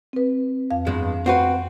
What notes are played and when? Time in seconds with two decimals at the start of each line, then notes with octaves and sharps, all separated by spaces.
0.13 C4 B4
0.71 F2 F5
0.86 E2 G2 G#3
1.26 C4 F#4 B4 F#5